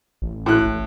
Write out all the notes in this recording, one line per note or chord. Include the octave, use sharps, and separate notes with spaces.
A1
A2 F#6
A1